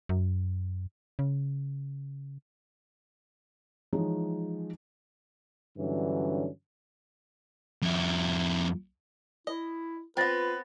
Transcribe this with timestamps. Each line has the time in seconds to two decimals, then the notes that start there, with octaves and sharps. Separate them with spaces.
0.09 F#2
1.19 C#3
3.93 E3 F3 G#3 D#4 C#5
5.78 G2 D3 E3 F#3 C#4
7.82 F2 E4
9.47 E4 D#5
10.17 B3 C4 F4 B4 G5 A6 A#6